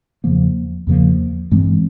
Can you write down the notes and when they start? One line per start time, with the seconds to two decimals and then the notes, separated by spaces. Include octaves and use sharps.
0.24 E2 C#3 F3 A#3
0.87 E2 C#3 F3 A#3
1.51 G2 E3 G#3 C4